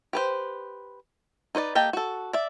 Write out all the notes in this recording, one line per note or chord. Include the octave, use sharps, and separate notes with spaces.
G4 B4 C5
D#4 B4 C5 D5
A#3 G4 A4 D#5 G5
F#4 A4
D5 E5